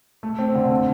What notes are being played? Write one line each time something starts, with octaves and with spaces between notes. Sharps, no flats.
A3
C4
D3
A3